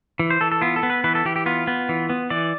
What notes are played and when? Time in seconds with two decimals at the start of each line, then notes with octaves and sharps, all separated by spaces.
0.19 E3
0.30 C5
0.41 E3 A4
0.51 A4
0.61 B3 F4
0.76 A4
0.83 B3
0.90 B4
1.04 E3 B4
1.15 A4
1.25 E3 G4
1.36 G4
1.46 B3 F4
1.67 B3
1.89 E3
2.10 B3
2.30 E3 D5